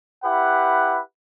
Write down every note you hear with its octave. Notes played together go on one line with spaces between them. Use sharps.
E4 G4 B4 F#5